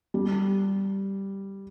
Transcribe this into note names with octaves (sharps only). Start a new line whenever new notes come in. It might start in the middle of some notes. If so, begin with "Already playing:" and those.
G3